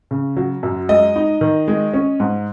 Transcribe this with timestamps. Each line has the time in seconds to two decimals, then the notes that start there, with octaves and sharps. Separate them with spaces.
0.11 C#3
0.36 F#3
0.63 F#2
0.89 G#3 D#5
1.16 D#4
1.41 D#3
1.68 G#3
1.94 C#4
2.20 G#2